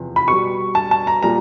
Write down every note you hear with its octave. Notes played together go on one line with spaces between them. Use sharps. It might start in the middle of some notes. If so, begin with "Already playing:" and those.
Already playing: E2 C3 F3
B5
B2 G3 C#6
A5
A5
A#5
A#2 G3 A#5